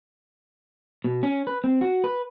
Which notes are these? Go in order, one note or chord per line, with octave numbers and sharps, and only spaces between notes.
B2
C#4
B4
C4
F#4
B4